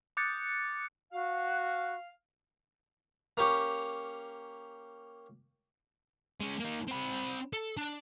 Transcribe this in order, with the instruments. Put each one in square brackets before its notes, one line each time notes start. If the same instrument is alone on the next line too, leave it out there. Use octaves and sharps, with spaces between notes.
[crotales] D6 D#6 F#6 G6 A6 C#7
[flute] F#4 [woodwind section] F5
[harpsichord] A#3 C#4 G4 C#6
[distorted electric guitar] G#3 C#4
A#3 D#4
C4 B5
A4
D4